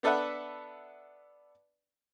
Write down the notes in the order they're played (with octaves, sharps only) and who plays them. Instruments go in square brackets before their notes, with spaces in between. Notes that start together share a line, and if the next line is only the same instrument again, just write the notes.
[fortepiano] B3 D4 A4 B4 E5 F#5